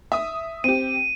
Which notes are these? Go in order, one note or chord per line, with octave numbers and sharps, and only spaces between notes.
E5 D#6
C4 G4 D#7